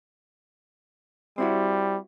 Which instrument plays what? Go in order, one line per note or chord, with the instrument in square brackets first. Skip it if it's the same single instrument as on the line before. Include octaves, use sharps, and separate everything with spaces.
[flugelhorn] G3 [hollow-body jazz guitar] C4 E4 F#4